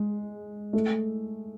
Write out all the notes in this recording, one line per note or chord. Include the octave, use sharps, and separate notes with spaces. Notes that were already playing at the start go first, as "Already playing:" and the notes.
Already playing: G#3
A3